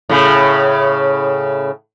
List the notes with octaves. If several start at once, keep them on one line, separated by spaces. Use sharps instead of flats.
A2 C#3